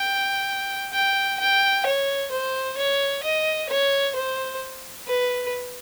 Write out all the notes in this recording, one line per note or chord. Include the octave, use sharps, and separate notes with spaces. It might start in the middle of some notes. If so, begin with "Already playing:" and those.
Already playing: G5
G5
G5
C#5
C5
C#5
D#5
C#5
C5
B4